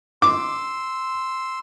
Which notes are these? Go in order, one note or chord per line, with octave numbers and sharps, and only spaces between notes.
C6 D6 E6